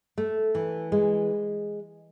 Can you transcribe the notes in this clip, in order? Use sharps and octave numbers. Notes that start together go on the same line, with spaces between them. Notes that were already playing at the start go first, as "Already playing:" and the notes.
A3
E3
G#3